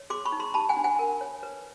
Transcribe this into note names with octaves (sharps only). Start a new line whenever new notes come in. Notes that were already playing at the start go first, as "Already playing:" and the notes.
Already playing: C#5
G#4 C6 D6
B5 C#6
D#4
A#5 C6
G4 A5 B5
F#5 G#5
D4
F#5 G#5
A#4
C#5
B4